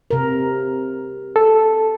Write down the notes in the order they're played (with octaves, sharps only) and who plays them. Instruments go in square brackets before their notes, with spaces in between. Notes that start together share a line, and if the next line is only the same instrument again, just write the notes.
[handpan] C3 A#4
[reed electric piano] A4